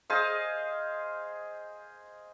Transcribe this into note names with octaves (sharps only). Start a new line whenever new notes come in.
G#4 C5 D#5 F5